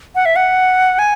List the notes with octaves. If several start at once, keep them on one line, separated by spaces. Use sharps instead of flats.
F#5
E5
F#5
G#5